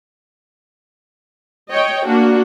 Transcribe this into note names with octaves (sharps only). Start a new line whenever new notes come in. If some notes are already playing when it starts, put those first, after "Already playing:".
C#5 D#5 G5
A#3 D4 F#4